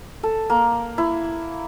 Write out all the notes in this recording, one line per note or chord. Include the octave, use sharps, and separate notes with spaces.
A4
A#3
E4